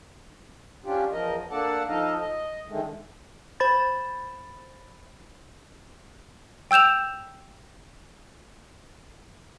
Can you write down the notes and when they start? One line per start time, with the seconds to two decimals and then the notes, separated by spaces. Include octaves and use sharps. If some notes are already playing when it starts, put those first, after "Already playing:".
0.85 C#4 D4 F4 G4
1.12 E2 F3 A#4 D#5
1.51 A#3 D4 A4 D5 F#5 A5
1.88 F3 D#4 A4 D#5 F5
2.20 D#5
2.68 D3 D#3 G#3 A3
3.60 C5 B5 A6
6.71 G5 E6 G6 E7 F7